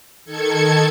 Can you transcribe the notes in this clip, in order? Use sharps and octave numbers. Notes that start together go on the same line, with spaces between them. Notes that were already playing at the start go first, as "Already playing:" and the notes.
D#3 A4 G#6 C#7